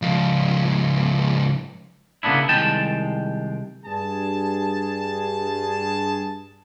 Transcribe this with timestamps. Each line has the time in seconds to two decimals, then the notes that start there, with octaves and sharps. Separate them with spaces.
0.02 C#2 F3
2.23 C#3 A#3 B3 D4 E4
2.48 C2 D#3 G#3 G5 A5
3.86 G2 G#4 A5